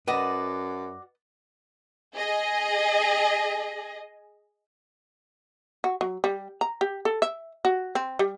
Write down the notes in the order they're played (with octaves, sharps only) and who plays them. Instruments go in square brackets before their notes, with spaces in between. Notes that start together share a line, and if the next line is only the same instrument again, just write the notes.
[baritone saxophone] F#2 [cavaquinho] F#4 D5 [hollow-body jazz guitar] B4 D#5
[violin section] G#4 D#5
[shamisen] F#4
F#3
G3
A#5
G4
A4
E5
F#4
C4
G3